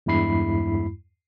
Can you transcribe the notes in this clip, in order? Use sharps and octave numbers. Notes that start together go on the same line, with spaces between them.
E2 G2 G#3 E4 B5 C7